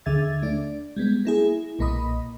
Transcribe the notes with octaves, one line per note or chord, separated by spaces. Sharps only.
D#2 D3 G#4 E5 G#6 A6
A3 D4 D5
G3 G#3 B3
A#3 E4 G#4
B1 A#2 A#3 D#5 B5 D#6